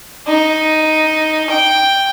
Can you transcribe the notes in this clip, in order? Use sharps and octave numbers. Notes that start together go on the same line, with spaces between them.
D#4
G5